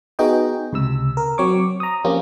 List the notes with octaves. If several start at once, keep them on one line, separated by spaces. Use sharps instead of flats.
B3 D#4 F#4 G#4 D#5 G5
C#2 C3 E6
A#4
F#3 C4 C#5 C#6 D6
A#5 D#6
F3 A#3 C4 C#4 F4 G4